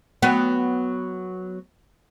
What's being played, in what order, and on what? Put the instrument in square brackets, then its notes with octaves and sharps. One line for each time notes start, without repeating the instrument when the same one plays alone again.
[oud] F#3 B3